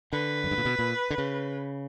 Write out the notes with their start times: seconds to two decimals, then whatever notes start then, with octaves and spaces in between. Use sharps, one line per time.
0.13 D3 B4
0.44 F#2
0.51 G2
0.58 A#2
0.65 B2
0.79 A#2
1.10 D3
1.18 C#3